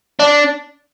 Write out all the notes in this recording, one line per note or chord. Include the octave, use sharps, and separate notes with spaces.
D4